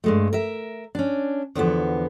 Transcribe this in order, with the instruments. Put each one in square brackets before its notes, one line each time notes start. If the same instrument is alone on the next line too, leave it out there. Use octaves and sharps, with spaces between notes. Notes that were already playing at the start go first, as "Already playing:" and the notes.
[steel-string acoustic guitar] G2 G#3 A3
A#4 E5
C#4 D4
E2 D3 F3 B3